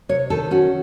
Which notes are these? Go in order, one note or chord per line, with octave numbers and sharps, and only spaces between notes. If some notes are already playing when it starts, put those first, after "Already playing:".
C3 C#5
D#3 A4
C#4 F#4